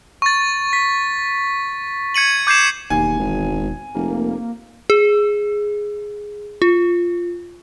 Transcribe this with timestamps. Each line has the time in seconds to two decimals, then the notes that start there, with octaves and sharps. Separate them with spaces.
0.22 C#6 A6
0.73 B6
2.14 G#6 C#7 D#7 F#7
2.47 D6 G6 G#6 C7 E7
2.90 E1 D#2 G#5
3.19 G#1
3.95 F1 A#3
4.90 G#4
6.62 F4